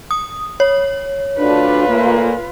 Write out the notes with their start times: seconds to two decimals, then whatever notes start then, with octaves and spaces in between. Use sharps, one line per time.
0.11 D#6
0.60 C#5
1.39 D2 D4 F4 B4
1.88 A#2 A3 A#3